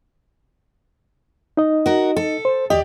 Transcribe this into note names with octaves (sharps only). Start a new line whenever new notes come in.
D#4 D#5
F#4 A#4
A4
C5
D#2 G4 D5 D#5